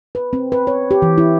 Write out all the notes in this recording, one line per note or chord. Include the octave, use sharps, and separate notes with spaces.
B4
C4
B4
C#5
G4
E3
E4